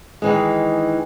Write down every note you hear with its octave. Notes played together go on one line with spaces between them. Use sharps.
D#3 E3 G#3